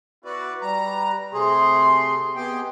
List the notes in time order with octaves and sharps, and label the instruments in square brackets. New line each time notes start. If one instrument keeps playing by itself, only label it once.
[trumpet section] B3 E4 F#4 [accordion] B4 D5
[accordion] G3 A#5 [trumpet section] B4
[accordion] C3 A3 G#4 [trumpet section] C6
[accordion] B3 G4 G5 [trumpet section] G#4 D#5